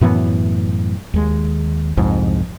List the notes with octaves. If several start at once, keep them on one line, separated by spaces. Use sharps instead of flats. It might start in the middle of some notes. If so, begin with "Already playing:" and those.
F#2 A2 E3 B3
D#2 G#3
C2 F2 G#2